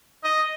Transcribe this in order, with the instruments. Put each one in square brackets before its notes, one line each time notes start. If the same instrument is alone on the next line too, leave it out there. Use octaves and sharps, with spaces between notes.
[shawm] D#5